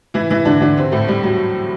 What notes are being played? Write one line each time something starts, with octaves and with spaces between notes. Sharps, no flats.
E3 E4
E3 E4
D3 D4
D3 D4
C3 C4
A2 A3
G3
F#3